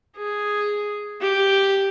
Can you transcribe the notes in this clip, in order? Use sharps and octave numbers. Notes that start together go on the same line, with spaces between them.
G#4
G4